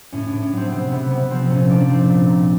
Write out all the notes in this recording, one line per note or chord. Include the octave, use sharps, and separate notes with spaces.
A2 C#4
D4
A2
C#4
F#3 C4
B3
C3 C4
C3 B3
C3 B3
F3 C4
A#2 C#4
F3 D4
A#2 C4
A#2
A#2